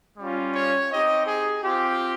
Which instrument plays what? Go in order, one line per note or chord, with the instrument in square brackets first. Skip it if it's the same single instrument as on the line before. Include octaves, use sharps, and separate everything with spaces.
[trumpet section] G3 C#4 F4
C#5
C4 D#4 G4 D#5
G#4
C4 F4 G4